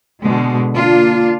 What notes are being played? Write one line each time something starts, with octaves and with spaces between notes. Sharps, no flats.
B2 D3 G#3
A#3 D4 F4